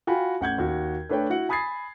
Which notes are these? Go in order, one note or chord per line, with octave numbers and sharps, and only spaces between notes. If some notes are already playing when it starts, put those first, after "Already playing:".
F4 F#4 G5 G#5 B5
A1 F#5 G6 G#6
D#2 F#4
A3 D4 B4 C#5 G5
E4 F#4 F#5
G#5 B5 D#6 G#6 A6 C7